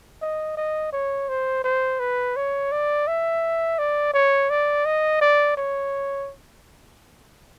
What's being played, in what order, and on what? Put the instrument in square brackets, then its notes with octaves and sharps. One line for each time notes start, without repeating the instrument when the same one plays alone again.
[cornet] D#5
D#5
C#5
C5
C5
B4
C#5
D5
E5
D5
C#5
D5
D#5
D5
C#5